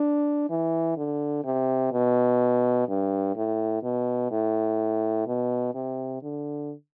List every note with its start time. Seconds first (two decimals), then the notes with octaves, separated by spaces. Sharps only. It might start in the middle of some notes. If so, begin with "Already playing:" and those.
Already playing: D4
0.49 E3
0.97 D3
1.44 C3
1.92 B2
2.88 G2
3.36 A2
3.83 B2
4.31 A2
5.27 B2
5.74 C3
6.23 D3